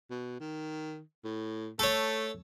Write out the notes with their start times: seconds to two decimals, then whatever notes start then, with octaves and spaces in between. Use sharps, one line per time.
0.10 B2
0.40 D#3
1.24 A2
1.79 A3 A4 C#5